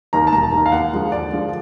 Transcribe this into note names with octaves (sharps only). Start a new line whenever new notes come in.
D#2 D#3 A#5
A5
E1 A#5
D#2
D#3
F5
D#2 F#5
D3 F3 G#3
D#2 D5
D3 F3 G#3